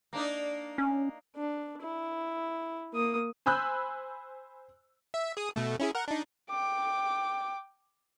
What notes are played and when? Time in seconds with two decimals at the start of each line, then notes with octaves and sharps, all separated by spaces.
0.13 A#3 D4 D#4
0.78 C#4
1.36 D4
1.82 E4
2.94 A#3 D#6
3.46 C5 G#5 B5 E6 F#6 G6
5.14 E5
5.37 G#4 D#6
5.56 B2 A3
5.79 C#4 E4 G#4
5.95 A#4 F#5
6.08 D4 D#4
6.50 G5 D6